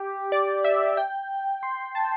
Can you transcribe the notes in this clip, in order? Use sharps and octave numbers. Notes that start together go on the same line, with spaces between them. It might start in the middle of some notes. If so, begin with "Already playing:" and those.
Already playing: G4
D5
E5
G5
C6
A5